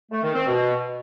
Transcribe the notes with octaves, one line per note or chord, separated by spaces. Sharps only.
A3
D#3
C4
B2